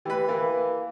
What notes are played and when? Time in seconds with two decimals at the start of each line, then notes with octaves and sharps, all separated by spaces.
0.05 E3 G4 B4
0.28 E3 A#3